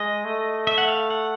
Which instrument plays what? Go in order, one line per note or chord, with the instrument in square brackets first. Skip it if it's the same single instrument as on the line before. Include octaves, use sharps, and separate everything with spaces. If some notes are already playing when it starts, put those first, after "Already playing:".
Already playing: [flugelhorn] G#3 [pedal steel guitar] D#5
[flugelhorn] A3
[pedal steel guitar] E5
F#5
F5
F#5